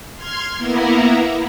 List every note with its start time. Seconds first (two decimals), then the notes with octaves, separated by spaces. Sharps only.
0.16 C6 F6 G#6
0.57 A#3 B3 E4 A#4